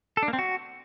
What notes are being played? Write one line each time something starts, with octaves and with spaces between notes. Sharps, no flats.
A4
D4
A#3
C4
F#4